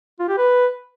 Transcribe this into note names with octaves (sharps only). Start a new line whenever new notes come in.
F4
G4
B4